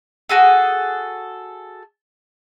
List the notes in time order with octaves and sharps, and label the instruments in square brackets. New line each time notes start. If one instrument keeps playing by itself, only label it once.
[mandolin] F#4 G#4 A4